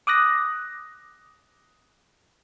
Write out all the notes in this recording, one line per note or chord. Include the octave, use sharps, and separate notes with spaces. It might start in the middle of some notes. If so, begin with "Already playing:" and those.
D6 D#6 F#6 A#6